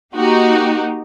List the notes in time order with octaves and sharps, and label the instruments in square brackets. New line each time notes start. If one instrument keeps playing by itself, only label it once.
[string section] A#3 D#4 F#4 G4